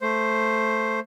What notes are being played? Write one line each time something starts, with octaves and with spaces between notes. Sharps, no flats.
A3 C5